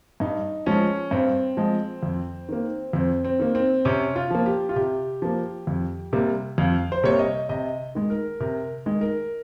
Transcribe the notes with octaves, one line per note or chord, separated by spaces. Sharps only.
G2 D#4
F3 G#3 C#4
G2 C4
F3 G#3
F2
D#3 A#3
F2 C4
C4
D#3 A#3
C4
C3 C#4
F4
F3 A#3
G4
F4
C3 G4
F3 A#3
F2
C3 G3 A#3
F2 F5
C5
C3 G3 A#3 C#5
D#5
C3 D#5
D#3 G#3
A#4
C3 A#4
D#3 G#3
A#4